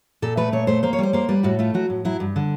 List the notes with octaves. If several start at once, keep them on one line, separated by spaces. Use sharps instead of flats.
A#2 A4
A3 B4
A#2 C#5
A3 C5
A#3 C5
C#5
G3 C5
A#3 C5
G3 B4
A2 F#4
A3 F4
F#3 F#4
A2
F#3 E4
G2
D3